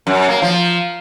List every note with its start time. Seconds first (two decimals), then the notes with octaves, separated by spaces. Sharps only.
0.07 F#2
0.29 A#3
0.42 F3